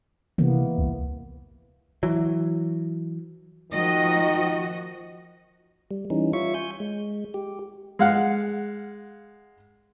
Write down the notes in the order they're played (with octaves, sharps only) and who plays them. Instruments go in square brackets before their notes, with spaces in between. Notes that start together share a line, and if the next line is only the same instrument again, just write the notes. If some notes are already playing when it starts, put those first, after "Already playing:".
[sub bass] C3 [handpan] E3 A#3 B3
[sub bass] C2
[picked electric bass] E3 F#3
[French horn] D#3 [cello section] F3 F#4 D#5
[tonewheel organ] G3
E3 G3 C#4 D#4
F4 C#5 E5 C#6
G#5 G6
G#3
G4
[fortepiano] G#3 F5 F#5